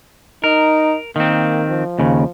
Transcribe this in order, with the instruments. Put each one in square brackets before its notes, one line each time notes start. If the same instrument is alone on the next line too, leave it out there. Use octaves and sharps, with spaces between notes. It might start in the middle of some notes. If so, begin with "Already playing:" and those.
[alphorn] D#4 [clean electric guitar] A#4
[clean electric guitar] D#3 C4 [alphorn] A#3
[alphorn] F3
[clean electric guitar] D#2 C#3